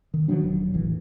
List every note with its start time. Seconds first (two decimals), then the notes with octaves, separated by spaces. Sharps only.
0.14 D#3
0.28 D#3 F3 F#3 D4
0.43 E1 F#3
0.74 E1 A1 E3